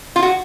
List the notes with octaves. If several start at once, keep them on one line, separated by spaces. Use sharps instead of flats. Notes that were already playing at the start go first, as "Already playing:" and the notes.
F4
F#4